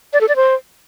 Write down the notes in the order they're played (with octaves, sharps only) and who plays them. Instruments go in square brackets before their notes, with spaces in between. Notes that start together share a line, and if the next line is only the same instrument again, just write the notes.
[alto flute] D5
A4
D5
C5